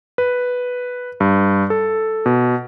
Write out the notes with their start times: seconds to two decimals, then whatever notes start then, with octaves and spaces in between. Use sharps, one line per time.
0.18 B4
1.20 G2
1.70 A4
2.26 B2